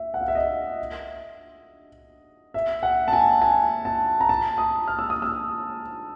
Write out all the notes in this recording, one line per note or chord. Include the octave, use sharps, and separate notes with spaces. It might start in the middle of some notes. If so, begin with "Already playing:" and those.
Already playing: E5
F#5
F5
E5
D#5
E5
F#5
A5
G#5
G#5
A5
A#5
A5
D#6
F6
E6
D#6
E6